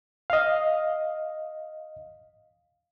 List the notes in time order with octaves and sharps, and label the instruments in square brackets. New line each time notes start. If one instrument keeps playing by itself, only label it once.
[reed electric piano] D#5 F5